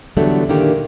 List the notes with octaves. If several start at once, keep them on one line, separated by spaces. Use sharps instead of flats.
E2 D3 F#3 G3 A3 B3
A#2 D3 D#3 A#3 E4 G4